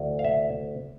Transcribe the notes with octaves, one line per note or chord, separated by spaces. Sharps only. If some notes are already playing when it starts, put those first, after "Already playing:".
Already playing: D2 E3
F5
E5